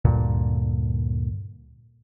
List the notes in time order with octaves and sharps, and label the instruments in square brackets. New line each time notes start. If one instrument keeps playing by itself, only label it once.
[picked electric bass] D2 G2 A#2 D3